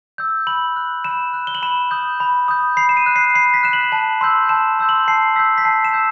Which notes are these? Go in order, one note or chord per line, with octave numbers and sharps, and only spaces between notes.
E6 G6
B5 F#7
F#6
B5 E7
F#6
G7
F#7
B5 E7
D#6 G6
B5
D#6 G6
B5 C7
E7
D#7
F#6
C7
B5 C7
B6
F#6 E7
F#7
A5 F#7
C6 E6 G6
A5 E7
C6 E6 G6
F#7
A5 C7
E6 G6 B6
B6
A5 C7
E7
E6 G6